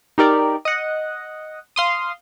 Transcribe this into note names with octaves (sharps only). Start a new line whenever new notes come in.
D#4 G4 A#4 D5
D#5 F#5
F5 C6 D#6